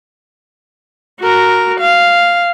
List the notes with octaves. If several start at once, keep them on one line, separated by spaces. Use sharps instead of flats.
F#4 A#4
F5